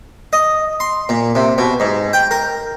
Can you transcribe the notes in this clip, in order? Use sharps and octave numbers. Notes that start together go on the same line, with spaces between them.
D#5
C6
A#2
C3
B2
G#2
G5
A#4